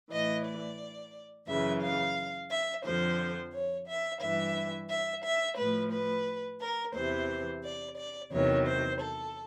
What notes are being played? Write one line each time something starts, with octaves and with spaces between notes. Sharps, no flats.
A2 E3 D#5
D5
F#2 C#3 E3 E5
F5
E5
F2 D3 F3 C5
C#5
E5
G2 E3 E5
E5
E5
A2 F3 B4
B4
A#4
E2 C3 E3 C5
D5
D5
E2 C3 D#3 F#3 C#5
C5
A4